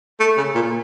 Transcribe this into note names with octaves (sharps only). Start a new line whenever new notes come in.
A3
C#3
A#2